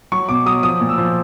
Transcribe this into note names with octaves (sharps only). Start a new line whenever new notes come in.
F#3 C#6
B2 D6
F#3 D#6
F3 D#6
A#2
E6
F3